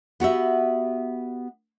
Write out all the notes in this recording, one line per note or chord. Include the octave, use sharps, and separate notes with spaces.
B3 F#4 G4 E5